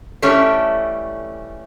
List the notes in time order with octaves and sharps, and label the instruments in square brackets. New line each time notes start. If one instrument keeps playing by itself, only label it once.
[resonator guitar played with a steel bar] E3 G3 A3 C#4